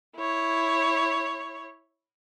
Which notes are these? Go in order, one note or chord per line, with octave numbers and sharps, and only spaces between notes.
E4 C#5